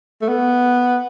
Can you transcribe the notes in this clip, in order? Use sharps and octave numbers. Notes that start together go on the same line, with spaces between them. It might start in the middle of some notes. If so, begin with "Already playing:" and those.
A3
B3